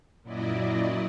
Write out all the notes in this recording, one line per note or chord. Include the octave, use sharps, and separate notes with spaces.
F#2 A#2 F#3 E4 D5 D#5